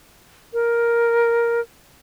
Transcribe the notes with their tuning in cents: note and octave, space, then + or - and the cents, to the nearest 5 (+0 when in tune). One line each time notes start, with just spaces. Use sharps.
A#4 +5